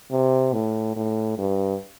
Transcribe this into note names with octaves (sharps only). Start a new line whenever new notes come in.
C3
A2
A2
G2